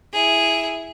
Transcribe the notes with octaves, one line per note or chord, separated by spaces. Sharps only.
E4 G#4